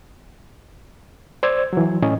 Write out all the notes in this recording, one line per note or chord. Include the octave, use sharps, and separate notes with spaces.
C5 D5 E6 G#6
E3 F#3
A2 C#4 D#5